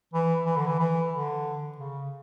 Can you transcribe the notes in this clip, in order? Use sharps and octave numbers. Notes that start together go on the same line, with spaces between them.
E3
E3
D3
E3
E3
D3
C#3